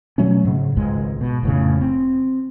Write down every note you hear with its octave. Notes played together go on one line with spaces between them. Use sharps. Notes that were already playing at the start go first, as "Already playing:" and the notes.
B2 F#3 A3 C#4
G#2 C#3
G#1 C#2 G#2 G#3
B2
F1 A2 C#3
C4